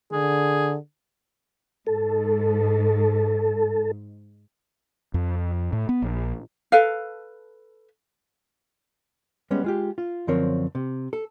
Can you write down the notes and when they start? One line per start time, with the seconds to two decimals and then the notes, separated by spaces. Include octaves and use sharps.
0.12 D3 G#4
1.87 G#2 A4
5.14 F2
5.73 A2
5.89 B3
6.02 A#1
6.72 A4 B4 F5
9.51 G3 G#3 B3 C#4
9.64 G#3 F4 G4
9.98 F4
10.27 F#2 D3 F3 C4 A#4 C#5
10.75 C3
11.13 A4